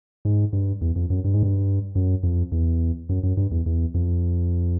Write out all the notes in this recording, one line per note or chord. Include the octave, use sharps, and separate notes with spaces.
G#2
G2
E2
F2
F#2
G2
G#2
G2
F#2
F2
E2
F#2
F#2
G2
E2
E2
F2